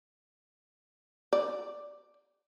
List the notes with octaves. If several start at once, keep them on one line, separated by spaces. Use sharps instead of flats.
D5